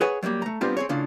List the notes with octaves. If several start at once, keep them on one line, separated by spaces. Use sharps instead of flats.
G#4 B4 C#5 F#5 G#5
F#3 G3 A3 A#3
A3 A#5
G3 B3 C4 D4 F4 G4
C4 G#4 C#5
A2 C#3 D4 F4